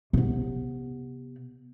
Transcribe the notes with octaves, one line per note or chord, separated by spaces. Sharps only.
C3 B3